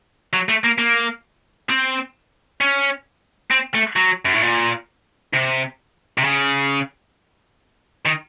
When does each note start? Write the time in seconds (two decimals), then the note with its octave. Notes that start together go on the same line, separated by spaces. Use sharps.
0.33 F#3
0.49 A3
0.64 A#3
0.78 A#3
1.69 C4
2.61 C#4
3.51 C4
3.75 A3
3.96 F#3
4.25 F#2
4.34 A2
4.43 A#2
5.34 C3
6.18 C3
6.24 C#3
8.06 D#3